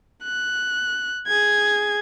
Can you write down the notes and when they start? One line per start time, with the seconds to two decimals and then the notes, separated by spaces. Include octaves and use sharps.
0.24 F#6
1.27 G#4 G#6